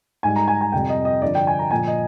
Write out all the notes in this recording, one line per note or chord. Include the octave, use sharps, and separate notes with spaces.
G#2 G3 G#5
A#5
G#5
G#5
F2 C3 G3 G5
D#5
D#5
G2 D3 F3 D5
G5
G#5
A#5
A#2 F3 G#5
D#5